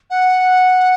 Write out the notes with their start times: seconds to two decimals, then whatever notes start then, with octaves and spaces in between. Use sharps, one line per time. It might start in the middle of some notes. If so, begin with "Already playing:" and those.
0.10 F#5